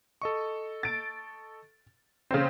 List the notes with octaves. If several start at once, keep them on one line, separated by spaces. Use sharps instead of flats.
A4 D#5 C#6
A6 D7
C#3 C4 C5 C#5 F5